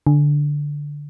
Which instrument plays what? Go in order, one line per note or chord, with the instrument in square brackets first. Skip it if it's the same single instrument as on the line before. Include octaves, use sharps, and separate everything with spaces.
[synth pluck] D3